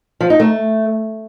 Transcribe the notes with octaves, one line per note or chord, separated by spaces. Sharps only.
F3
D#4
A3